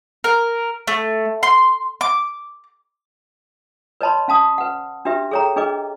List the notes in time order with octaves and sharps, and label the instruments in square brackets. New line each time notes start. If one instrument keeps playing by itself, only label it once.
[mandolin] A#4
A3
C6
D6
[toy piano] B4 C#5 D#5 A5 B5 C6
C#4 F5 A5 D#6
B4 F#5
D4 F#4 G4 B4 E5
G#4 A4 C#5 G5 A#5
D4 G#4 B4 D#5 D6